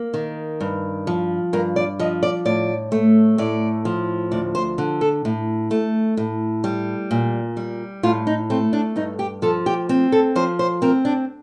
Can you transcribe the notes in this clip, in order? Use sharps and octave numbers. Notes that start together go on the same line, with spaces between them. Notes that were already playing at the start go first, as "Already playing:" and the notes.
Already playing: A#3
D#3
G2
F3
G2 A#4
D5
F3 D#5
D5
A2 D5
A3
A2 D5
F3
D2 D5
C5
D3
A4
A2
A3
A2
G3
A#2
G3
A2 F4
D#4
A3 C4
D4
G2 D#4
G4
F3 A4
G4
C4
A4
F3 C5
C5
C4 A#4
D4